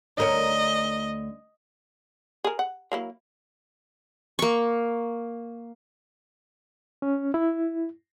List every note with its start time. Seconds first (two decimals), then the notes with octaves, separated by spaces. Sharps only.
0.18 D2 A#4 C#5 D#5
2.44 G#4 A#4
2.59 F#5
2.92 F#3 A#3 E4
4.39 A#3 C#6
7.02 C#4
7.34 E4